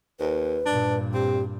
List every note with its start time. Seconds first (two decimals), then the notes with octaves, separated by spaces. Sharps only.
0.19 D#2 B4
0.65 G2 A#2 D4
1.14 C4 G4